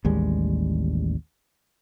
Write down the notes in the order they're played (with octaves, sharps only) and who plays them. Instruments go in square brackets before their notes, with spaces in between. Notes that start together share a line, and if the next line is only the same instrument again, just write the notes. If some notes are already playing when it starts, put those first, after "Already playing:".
[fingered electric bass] A1 D#2 G3 G#3